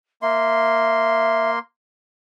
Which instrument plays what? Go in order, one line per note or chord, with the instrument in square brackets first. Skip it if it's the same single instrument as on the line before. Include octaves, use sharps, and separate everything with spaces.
[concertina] A#3 C6 [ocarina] E5